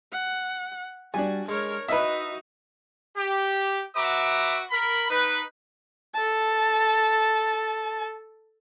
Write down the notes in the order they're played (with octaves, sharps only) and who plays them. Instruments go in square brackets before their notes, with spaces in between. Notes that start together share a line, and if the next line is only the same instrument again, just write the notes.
[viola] F#5
[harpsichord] G3 [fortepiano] D4 G#5 [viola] F#4
[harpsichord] G#3 [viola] A#4 C#5
[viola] D#4 F#4 [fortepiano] B4 E5 [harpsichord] D#5
[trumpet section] G4
F#4 B4 E5 A#5 D6
A#4 B5
D#4 B4
[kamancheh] A4 A5